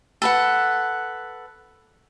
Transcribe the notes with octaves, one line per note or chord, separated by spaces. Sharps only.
A4 B4 F#5